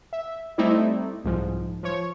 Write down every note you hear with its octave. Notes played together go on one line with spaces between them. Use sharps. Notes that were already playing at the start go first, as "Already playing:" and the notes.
E5
G3 A3 C4 D#4 E4 D5
C2 G#2 F3
F3 C#5